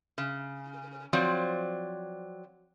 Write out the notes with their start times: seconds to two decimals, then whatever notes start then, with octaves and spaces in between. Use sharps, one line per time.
0.18 C#3
1.13 F3 F#3 C4 D5